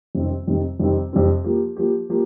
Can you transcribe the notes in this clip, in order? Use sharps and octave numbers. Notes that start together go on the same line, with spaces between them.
F2 C3 D#3 G3 C4
F2 C3 D#3 G3 C4
F2 C3 D#3 G3 C4
F2 C3 D#3 G3 C4
F3 A#3 G4
F3 A#3 G4
F3 A#3 G4